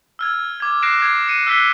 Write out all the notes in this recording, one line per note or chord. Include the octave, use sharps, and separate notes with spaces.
E6 F6 G#6
D6 G#6
D6 F#6 A#6 C7 D7 E7
D6 G#6 C7
C#7 D#7
E6 F#6 B6 C7 G7